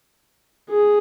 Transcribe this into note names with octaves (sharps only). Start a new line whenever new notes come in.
G#4